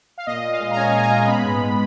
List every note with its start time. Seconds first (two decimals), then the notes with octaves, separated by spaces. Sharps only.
0.18 F5
0.27 A#2 D#5
0.44 A#2
0.52 F5
0.60 G#3
0.71 A#5
0.77 C#4 G#5
0.93 C#4 G#5
1.02 A#5
1.10 G#3
1.27 B3 B5
1.44 G#2
1.60 G#2